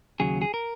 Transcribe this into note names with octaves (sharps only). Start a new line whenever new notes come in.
D#2 C#3 F#3 G#4
G#4
A#4